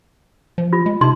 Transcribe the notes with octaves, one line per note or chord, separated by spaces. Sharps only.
F3
F4
G#3
C3 D#4 C6